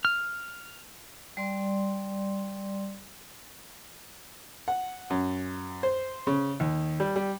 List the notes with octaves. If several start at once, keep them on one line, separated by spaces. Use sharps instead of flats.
F6
G3 D5 C6
F#5
F#2
C5
C#3
D#2
G3
G3